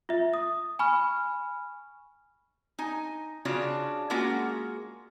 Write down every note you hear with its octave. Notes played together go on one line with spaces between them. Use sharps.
F4 E5
D#6
G#5 B5 C#6 F6
D#4 G#5
C#3 D4 F4 F#4 C#5
G#3 A#3 C#4 F4 F#4